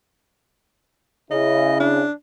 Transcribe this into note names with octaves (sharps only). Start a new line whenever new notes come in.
C#3 E4 D#5
D4